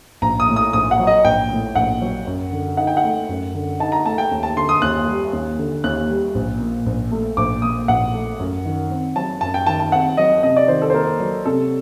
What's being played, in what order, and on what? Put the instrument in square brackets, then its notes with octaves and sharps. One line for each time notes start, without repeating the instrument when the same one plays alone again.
[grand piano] A#1 [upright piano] A#5
[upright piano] D#6
[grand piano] A2
[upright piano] D#6
[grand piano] A#1 [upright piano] D#6
[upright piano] F#5
[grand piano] F#3
[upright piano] D#5
[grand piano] A#1 [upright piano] G5
[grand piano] A2
[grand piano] A#1 [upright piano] F#5
[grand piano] F#3
F#2
D3
[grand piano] D#4 [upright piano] F#5
[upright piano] G5
F#5
[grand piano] A3
F#2
D3
[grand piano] D#4 [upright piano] A5
[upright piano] A#5
[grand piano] A3 [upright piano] A5
[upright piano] G5
[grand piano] D#2
[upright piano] A5
[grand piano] D3 [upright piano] C6
[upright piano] D#6
[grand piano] D#2 [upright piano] F#6
[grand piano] G3
D#2
D3
[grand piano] D#2 [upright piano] F#6
[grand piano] G3
A#1
A#2
A#1
A3
[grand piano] A#1 [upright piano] D6
[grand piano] A#2 [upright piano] D#6
[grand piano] A#1 [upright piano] F#5
[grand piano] A3
F#2
D#3
C4
[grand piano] F#3 [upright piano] A5
[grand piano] F#2 [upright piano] A5
[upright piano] G5
[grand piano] D#3 [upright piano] A5
[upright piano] A5
[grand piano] C4 [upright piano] F#5
[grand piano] F#3 [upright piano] D#5
[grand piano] C3 [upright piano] D#5
[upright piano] D5
[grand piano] D#3 [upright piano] C5
[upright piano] A4
C5
[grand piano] A#3 [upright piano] A#4
[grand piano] F#3
[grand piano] C3 [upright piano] A4